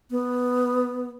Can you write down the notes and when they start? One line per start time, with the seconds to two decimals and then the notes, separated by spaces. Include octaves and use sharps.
0.11 B3